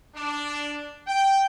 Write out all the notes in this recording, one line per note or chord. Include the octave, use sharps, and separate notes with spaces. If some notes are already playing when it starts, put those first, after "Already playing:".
D4
G5